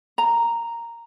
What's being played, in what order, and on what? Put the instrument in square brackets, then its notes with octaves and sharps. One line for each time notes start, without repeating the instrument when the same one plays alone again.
[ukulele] A#5